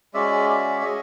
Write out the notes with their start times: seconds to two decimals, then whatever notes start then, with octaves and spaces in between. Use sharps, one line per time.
0.14 G#3 C#4 F#4 D5 E5
0.49 D5 E5
0.81 D5
0.85 G#3 C#4 C#5 D#5